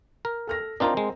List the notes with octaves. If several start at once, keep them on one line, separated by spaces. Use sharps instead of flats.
A#4
A4 F6 A#6
C4 D4 D#4 F4 A#4 A#5
G#3